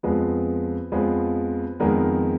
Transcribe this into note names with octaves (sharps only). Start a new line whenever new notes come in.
F2 F3 G#3 B3 B4
F2 F3 G#3 B3 B4
F2 D#3 G#3 B3 A#4